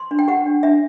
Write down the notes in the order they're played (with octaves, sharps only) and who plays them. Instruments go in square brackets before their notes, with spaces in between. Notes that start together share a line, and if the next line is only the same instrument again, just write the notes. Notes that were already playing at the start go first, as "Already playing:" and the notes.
Already playing: [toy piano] C6
D4
G5
G4 F#5
D4
D4 E5